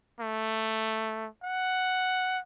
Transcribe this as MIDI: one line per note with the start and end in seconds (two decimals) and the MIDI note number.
0.20 1.28 57
1.43 2.40 78